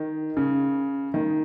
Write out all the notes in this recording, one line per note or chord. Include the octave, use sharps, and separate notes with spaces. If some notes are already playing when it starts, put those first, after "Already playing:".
Already playing: D#3
C#3
D#3